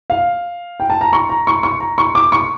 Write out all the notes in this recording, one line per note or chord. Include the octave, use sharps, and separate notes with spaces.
F5
G5
A5
A#5
C#6
A#5
C#6
C#6
A#5
C#6
D6
C#6